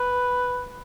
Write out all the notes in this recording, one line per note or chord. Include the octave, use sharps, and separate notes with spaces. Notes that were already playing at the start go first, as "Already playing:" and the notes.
Already playing: B4